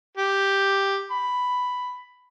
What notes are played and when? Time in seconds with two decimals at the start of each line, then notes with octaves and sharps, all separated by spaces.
0.17 G4
1.11 B5